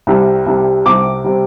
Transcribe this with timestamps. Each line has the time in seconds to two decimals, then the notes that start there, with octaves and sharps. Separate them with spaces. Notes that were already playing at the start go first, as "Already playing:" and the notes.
0.07 C2 C3 G3
0.46 C2 C3 G3
0.86 C2 C3 G3 D6
1.24 C3 G3